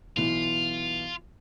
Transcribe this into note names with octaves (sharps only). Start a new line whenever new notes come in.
B1 E3 F4